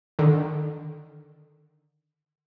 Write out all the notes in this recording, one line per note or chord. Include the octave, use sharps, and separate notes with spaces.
D3 D#3